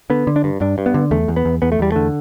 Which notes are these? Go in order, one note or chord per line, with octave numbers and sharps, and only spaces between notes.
D3 B3
D3
D4
G2
G2 D4
G2
B3
D3
E2 A3
E2
B3
E2
E2 B3
A3
E2 G3
D3 A3